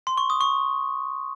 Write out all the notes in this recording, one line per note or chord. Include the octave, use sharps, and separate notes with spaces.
C6
C#6
D#6
C#6